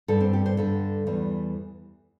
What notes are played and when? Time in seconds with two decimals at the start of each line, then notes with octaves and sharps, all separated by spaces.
0.08 G2 D3 G3 A4
0.20 C4
0.33 G4
0.46 C5
0.57 G2 D3 G3 A4
1.07 E2 E3 G3